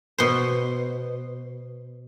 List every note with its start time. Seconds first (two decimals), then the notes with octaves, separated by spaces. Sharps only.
0.18 B2 C5